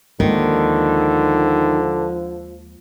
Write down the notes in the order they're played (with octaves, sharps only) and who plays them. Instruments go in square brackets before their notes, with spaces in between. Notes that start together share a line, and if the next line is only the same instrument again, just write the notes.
[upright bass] D#2 G#3 [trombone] D3 [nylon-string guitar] D#3 [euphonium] F3